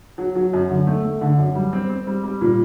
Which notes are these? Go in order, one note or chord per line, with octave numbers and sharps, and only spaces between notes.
F#3
F#3
F#2
D3
A3
A3
D3
F#2
G3
C4
C4
G3
G3
A#2